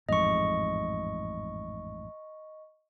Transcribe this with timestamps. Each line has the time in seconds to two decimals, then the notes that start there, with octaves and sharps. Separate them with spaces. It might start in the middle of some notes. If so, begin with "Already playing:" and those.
0.09 A1 F2 G#2 D#5 C#6